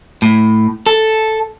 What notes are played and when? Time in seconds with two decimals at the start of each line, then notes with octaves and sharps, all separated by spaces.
0.22 A2
0.86 A4